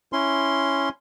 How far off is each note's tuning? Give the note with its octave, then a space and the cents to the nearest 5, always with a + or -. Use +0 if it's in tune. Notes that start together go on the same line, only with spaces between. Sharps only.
C#4 +0 E4 +0 C6 +0